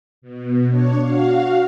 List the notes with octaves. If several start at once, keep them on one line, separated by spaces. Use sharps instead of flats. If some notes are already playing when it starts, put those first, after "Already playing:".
B2
D4 C#5
F#4 F5